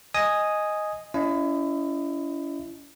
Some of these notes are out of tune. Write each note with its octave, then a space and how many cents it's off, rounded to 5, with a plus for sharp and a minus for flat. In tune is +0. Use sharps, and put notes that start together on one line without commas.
D#5 +0 G#5 +0 D#6 +0
C#4 +40 E4 +25 D#5 +0